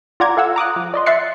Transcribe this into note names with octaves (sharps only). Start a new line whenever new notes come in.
F4 D5 F#5 A#5 D6 G#6
A4 F5 F#5 E6
A#5 D6 D#6 F#6
F3
D5 D#5 C6
E5 C6 F#6 A6 C7 C#7